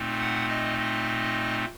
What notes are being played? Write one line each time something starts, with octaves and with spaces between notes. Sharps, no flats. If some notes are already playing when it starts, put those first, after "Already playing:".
Already playing: A#2 A3 C4 D#4
F#5
D#5
D#5